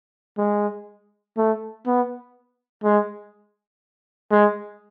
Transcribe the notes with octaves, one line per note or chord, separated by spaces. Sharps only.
G#3
A3
B3
G#3
G#3